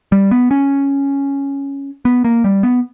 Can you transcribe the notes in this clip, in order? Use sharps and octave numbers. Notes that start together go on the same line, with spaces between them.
G3
B3
C#4
B3
A#3
G3
B3